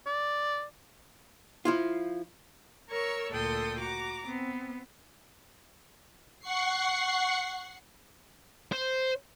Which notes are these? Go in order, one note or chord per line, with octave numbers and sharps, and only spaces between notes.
D5
F3 E4 F4
A#4 C#5 C#6 E6
D2 A#2 A4 G5 C6 D#6
F#4 A#5 D6
B3 C4
F#5 C#6 C7
C5